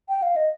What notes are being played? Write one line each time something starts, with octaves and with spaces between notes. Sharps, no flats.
G5
F5
D#5